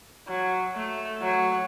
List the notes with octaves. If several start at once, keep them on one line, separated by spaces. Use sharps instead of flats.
F#3
A3
F#3